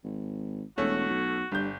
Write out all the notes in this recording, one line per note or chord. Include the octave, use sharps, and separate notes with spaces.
G#1
E1 A3 C#4 F#4
B1
G1 G2 G6